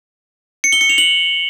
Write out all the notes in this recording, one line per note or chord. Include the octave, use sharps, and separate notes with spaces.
C#7
G7
C#7
F7
F#7